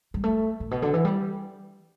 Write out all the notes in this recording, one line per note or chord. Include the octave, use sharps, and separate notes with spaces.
G3
A3
A2
B2
D3
E3
G3